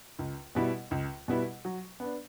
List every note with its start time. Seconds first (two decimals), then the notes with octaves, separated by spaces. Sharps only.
0.19 C#2
0.55 B2 G3 B3 E4
0.91 C#2
1.28 B2 G3 B3 E4
1.65 F#3
2.00 B3 D4